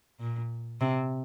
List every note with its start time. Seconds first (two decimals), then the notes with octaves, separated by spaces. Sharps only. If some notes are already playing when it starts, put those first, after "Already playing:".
0.20 A#2
0.81 C3